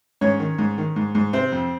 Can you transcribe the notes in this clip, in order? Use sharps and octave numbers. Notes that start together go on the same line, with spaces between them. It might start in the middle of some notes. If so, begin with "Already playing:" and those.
G#2 C#4 C#5
D#3
G#2
D#3
G#2
G#2
C3 C4 C5
F2